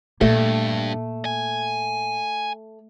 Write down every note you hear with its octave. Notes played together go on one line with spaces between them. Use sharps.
G2 A#2 A3 A#3
G#5